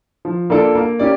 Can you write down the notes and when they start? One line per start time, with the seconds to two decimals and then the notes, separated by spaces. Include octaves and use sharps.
0.25 F3
0.50 A#3 D4 F4 A4
0.75 A#3
1.00 C#4 G4 D5